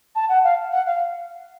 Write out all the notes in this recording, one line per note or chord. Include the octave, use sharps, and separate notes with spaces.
A5
F#5
F5
F#5
F5